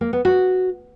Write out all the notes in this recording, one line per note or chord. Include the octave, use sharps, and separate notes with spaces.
A#3
B3
F#4